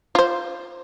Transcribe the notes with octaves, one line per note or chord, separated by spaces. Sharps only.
F4 C5